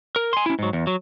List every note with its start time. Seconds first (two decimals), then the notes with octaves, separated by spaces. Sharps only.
0.16 A#4
0.33 G#5 C6
0.46 C#4 E4
0.59 G#2 F#3
0.73 E2
0.87 F#3